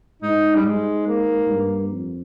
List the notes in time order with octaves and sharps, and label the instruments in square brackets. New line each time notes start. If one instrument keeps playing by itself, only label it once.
[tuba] G#2 [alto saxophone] D#4
[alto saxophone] G3
[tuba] G#2 [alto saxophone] G#3
[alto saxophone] A#3
[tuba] G2
F2